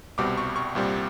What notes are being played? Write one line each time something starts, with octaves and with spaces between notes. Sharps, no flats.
C2 B2 G3 C4 D6
C#6
C#6
C2 A#2 G3 C4